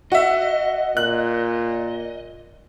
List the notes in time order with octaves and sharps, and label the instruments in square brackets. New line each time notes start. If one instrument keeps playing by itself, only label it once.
[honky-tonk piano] F#4 E5 [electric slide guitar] D#5
[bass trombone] A#2 [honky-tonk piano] F#6